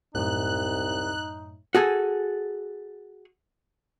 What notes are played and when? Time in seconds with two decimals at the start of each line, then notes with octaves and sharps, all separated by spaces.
0.15 C2 F#2 A2 D#4 F#6
1.75 F#4 G#4 A4 G#5